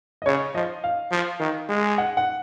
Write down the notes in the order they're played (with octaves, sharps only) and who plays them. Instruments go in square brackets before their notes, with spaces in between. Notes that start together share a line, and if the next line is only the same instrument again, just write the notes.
[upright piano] D#5
[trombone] C#3 [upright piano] C#5
[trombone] F3 [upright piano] D#5
[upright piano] F5
[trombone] F3
D#3
G#3
[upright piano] F#5
F#5